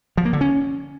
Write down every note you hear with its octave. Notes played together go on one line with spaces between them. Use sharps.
F3
A#3
D3
C#4